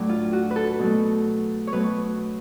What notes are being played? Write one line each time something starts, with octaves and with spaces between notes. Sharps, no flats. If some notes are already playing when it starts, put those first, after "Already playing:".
Already playing: A2 F#3 A3 D4
F4
F#4
B4
A4
B2 F#3 A3
C#5
B2 F#3 A3 B4